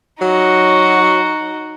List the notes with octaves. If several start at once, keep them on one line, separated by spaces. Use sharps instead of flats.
F#3 D#4 F#4